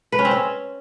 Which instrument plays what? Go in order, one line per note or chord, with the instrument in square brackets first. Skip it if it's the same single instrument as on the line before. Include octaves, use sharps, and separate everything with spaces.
[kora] B4
C#4
C4
C#4